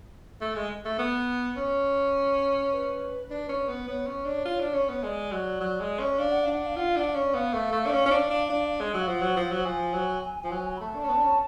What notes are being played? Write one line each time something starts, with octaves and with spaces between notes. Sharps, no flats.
A3
G#3
A3
B3
C#4
B4
D4
C#4
B3
B3 C#5
C#4
D4
F4
D4
C#4
B3
C#5
G#3 D5
F#3
F#3
G#3
C#4
D4 F5
F#5
F5
D4
F#5
F5
F4 F#5
F5
D4 F#5
F5
C#4
D5
B3 F5
A3
A3
D4
C#4
C#4
D4
D4
D4
G#3
F#3
F5
F3 F#5
F#3
F3
F#3 F#5
F3 G#5
F#3
F3
F#3
B5
A3 A5
D4
C#4
B3
D4
C#4